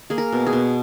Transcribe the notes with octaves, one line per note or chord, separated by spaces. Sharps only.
A#3 G#4
A#4
B2
G#4
B2